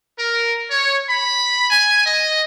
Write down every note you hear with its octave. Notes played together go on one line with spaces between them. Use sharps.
A#4
C#5
B5
G#5
D#5